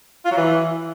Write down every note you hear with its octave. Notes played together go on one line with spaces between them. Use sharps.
F4
F#3
E3